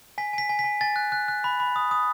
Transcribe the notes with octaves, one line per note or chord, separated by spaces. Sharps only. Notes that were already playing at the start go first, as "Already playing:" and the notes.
G#5 B6
G#5 B6
G#5
B6
G#5
G#5 A6
F#6
F#6
F#6
B5
B5
D#6
D#6